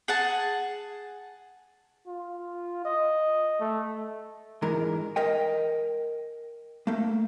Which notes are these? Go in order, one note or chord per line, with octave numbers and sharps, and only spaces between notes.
G#4 F#5 A5
F4
D#5
A3
G#2 E3 D4 A#4
A#4 D#5 G5
A3 A#3